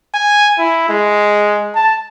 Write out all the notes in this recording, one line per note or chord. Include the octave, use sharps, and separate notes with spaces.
G#5
E4
G#3
A5